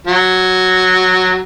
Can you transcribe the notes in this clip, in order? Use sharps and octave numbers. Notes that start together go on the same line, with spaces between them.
F#3